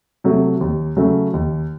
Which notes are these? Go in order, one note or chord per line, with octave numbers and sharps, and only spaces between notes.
C3 F#3 A3
D#2
C#3 F#3 A3
D#2